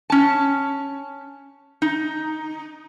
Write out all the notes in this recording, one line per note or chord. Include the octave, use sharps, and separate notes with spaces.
C#4 A5
D#4